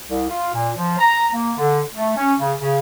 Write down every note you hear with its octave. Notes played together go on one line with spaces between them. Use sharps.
C2
F4
A#2
F3
A#5
A#3
D3
A3
C#4
C#3
C#3